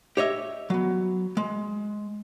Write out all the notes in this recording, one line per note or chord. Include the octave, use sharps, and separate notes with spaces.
G4 C#5 D#5 E5
F#3 B3
G#3